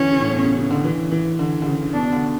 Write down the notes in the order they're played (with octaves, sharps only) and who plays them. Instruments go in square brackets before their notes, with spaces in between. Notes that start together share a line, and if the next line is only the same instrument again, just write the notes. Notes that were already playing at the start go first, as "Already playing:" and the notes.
Already playing: [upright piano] D3 E3 [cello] C#4
[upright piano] C#3
A2
B2
C#3
C#3
D3
E3
E3
D3
D3
C#3
[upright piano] B2 [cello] D4
[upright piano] D3